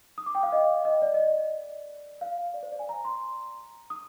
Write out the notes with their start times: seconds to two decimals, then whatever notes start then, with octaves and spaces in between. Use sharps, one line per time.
0.18 D#6
0.26 D6
0.35 G5
0.43 F5
0.52 D#5
0.85 D#5
1.02 D5
1.14 D#5
1.20 D5
2.21 F5
2.37 F5
2.54 D5
2.63 C5
2.72 D5
2.79 G#5
2.89 A#5
3.05 C6
3.90 D#6